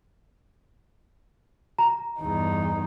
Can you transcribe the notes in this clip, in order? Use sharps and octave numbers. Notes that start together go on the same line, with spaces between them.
A#5
E2 G2 D#4